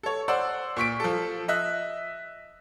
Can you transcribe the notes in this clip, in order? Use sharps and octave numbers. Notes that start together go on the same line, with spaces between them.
A4 C#5
C5 D5 F#5 E6
A#2 C#6 B6 D7
F3 A4
D#5 E5 F#6